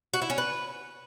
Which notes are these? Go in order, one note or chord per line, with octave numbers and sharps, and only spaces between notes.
F#4
E4
C#4
B4